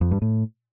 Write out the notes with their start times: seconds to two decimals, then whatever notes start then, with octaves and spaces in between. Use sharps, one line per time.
0.01 F2
0.11 G2
0.22 A2